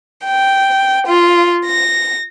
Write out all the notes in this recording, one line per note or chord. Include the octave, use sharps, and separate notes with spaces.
G5
F4
A#6